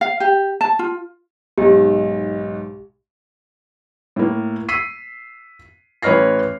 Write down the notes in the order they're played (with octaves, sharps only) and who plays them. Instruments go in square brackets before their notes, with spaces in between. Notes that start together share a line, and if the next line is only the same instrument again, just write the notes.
[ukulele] F5
G4
A5
F4
[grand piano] B1 G#2 [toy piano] G4
[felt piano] A2 A#3
E6 B6 C7 D#7
A1 B4 C#5 F6 A#6 C7